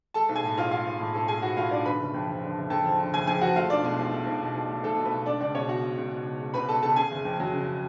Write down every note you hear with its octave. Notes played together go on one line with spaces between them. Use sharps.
G#3 A4 A5
B1
G#4 G#5
A2
B1 F4 F5
G#3 F4 F5
B1
A2
B1 A4 A5
G#3 G#4 G#5
B1 F#4 F#5
A2 F4 F5
B1 D4 D5
D3 B4 B5
F#1
F2
F3
D3
F#1
F2 A4 A5
F3
D3
F#1 G#4 G#5
F2 G#4 G#5
F3 F#4 F#5
A3 F4 F5
B1 D4 D5
B2 G#3 G#4
B1
A3
B1
B2
B1
A3
B1 A3 A4
B2
B3 B4
B1
G#3 D4 D5
C#2 D4 D5
B2 C#4 C#5
C#2 F#4 F#5
G#3
C#2
B2
C#2
G#3
C#2 B4 B5
B2 A4 A5
C#2 A4 A5
C#3 G#4 G#5
F#1
F2
F#3
C#3